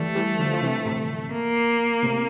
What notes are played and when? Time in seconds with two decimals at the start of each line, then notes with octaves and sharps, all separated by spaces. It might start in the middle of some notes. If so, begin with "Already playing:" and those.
Already playing: E3 G3 A3
0.15 E3 G3
0.39 D3 F3
0.53 F3
0.62 C3 E3
0.85 A2 C3
1.33 A#3
2.03 A2 C3